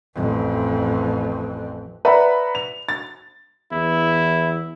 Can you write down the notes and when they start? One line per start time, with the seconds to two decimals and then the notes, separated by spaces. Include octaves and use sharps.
0.15 A1 F2
2.05 B4 D5 E5 F#5 A#5 B5
2.55 F7
2.89 A6
3.72 E2 E4